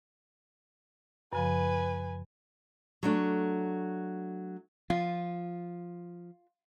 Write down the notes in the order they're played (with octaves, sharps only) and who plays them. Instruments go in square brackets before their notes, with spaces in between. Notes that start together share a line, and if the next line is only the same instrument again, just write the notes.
[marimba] F#2 C#3 F3 [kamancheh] B4 G#5
[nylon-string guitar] F#3 A3 D4
[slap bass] F3 [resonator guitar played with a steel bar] F4